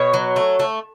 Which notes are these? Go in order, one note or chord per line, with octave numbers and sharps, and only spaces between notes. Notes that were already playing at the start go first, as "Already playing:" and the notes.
Already playing: B2 C#5
F#3
A3
A3